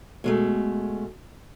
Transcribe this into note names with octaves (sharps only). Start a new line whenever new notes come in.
B2 G#3 A3